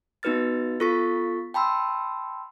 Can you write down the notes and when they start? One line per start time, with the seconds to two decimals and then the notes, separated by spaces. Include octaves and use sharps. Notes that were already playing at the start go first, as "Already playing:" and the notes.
0.23 B3 D#4 F#4 B4 F6 A6
0.80 B3 F4 A4 C#6 A6 B6
1.54 G5 A5 B5 C6 E6